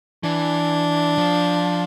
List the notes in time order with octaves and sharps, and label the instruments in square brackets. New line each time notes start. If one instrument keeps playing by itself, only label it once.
[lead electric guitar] E3 [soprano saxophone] D4
[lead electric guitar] F3